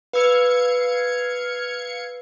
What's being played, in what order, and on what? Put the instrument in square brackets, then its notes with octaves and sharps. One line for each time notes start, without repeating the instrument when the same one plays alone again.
[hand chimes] B4 E6 [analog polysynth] F5 G#6 C#7